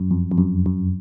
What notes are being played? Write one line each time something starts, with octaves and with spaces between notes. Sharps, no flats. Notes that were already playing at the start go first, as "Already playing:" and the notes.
Already playing: F#2
F2
F2
F#2
F#2